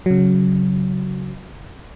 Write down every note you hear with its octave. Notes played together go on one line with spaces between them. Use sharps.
C#3 F#3